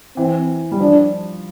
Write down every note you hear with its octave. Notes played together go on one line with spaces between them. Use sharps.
E3 C4
G3
F3 D4